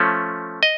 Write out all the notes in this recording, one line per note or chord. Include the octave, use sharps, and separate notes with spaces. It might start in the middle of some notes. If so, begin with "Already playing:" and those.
Already playing: F3 A3 C#4
D#5